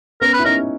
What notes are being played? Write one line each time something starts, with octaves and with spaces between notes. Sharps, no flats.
B3 C#4 A#4
B4
E4
C#4 D#4 A#4